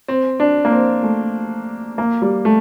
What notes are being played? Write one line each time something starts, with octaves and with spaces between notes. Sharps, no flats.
C4
D4
A#3
C4
A3
A#3
G3
A3